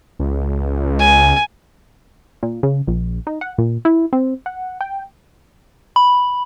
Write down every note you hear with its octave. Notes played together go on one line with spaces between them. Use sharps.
C#2
G#5
A#2
C#3
A#1
D#4
F#5
A#2
E4
C4
F#5
G5
B5